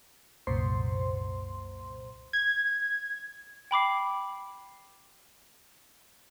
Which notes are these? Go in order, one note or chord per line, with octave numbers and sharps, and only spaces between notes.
C2 F#2 A#2 C5 C6
G#6
G5 B5 D6 C7